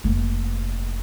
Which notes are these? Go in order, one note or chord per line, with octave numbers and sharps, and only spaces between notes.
F1 A#3